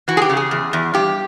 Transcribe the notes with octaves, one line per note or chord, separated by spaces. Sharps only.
E3 F#4
G#4
G4
C#3
G#4
E2
E2
G2 G4